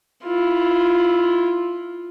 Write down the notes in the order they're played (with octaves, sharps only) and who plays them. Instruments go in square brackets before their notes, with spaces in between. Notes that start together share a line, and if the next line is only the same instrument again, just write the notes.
[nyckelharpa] E4 F4